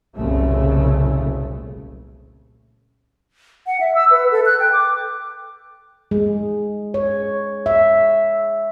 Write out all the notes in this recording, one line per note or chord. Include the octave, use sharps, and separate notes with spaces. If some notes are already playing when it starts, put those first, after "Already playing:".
F#1 C2 A#2 C#3 A3
F#5
E5
E6
B4
A4
F#6
G5
D6
G#3
C#5
E5